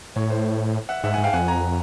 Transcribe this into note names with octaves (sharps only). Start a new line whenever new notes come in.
A2 C#5
C5
E5 F#5
G#2 E5 F#5
F#5 G#5
G#2
F5 G5
F2 F#5 G#5
G#5 A#5